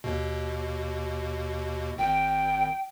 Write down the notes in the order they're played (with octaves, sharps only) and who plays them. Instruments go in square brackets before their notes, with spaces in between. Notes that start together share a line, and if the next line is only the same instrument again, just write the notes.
[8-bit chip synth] D#2 B2
[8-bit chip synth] G#1 [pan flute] G5